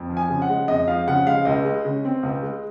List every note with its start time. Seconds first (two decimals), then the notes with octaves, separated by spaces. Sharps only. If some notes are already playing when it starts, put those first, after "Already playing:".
Already playing: F2
0.10 F3
0.17 G#5
0.29 C#3
0.42 F#5
0.49 G#3
0.68 F2 D#5
0.87 F3 F5
1.07 C#3 F#5
1.27 G#3 F5
1.45 C#2 D#5
1.65 G#3
1.85 C#3
2.05 C4
2.23 C#2
2.42 G#3